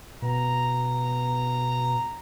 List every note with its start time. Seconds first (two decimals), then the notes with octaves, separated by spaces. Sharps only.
0.22 B2 A#5